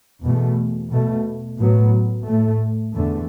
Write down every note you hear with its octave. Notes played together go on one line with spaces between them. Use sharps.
E2 B2 A3
B2 A3
A2 F#3 B3
A2 A3
E2 D3 A3